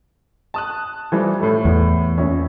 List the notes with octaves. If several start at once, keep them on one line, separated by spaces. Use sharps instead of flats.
A5 D#6 F#6
E3 F3 G3
A2 A3
E2
A#1 C#4